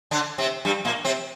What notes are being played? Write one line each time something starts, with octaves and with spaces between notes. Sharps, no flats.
D3 D4
C3 C4
G2 G3
A#2 A#3
C3 C4